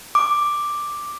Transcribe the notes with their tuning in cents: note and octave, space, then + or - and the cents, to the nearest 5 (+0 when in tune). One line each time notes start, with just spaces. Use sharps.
D6 +5